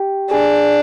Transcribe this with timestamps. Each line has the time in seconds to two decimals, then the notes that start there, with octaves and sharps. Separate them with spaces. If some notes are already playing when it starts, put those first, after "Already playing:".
Already playing: G4 G5
0.31 D4 G#4 G#5